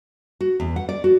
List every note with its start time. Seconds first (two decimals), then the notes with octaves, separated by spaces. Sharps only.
0.41 F#4
0.60 E2
0.76 F#5
0.89 D5
1.04 F#4